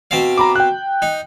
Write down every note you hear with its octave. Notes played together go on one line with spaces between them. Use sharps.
B2 C4 F5
A#5 B5 D6
G5 F#6
D#4